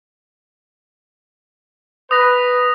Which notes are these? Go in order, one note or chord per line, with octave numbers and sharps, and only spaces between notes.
B4 D#6 A#6